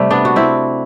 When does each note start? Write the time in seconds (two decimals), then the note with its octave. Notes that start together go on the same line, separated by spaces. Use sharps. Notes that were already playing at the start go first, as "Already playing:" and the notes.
Already playing: C3 G3 A3
0.11 B3 D4
0.25 F#4
0.36 C4 E4